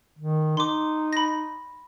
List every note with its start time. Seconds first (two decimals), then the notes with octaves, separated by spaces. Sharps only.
0.19 D#3
0.57 D#4 C6 D6
1.13 B5 A#6